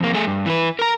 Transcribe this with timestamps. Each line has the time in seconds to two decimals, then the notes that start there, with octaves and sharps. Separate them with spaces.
0.01 F2 A#3
0.14 A3 G#4
0.27 G2
0.46 E3 B4
0.79 A#4 A#5